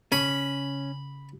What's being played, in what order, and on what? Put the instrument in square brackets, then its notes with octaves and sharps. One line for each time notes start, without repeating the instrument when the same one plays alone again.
[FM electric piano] C#3 [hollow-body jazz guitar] C#4 [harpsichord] B5